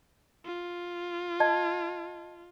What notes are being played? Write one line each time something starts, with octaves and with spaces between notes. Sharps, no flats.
F4
D#5 A5 G#6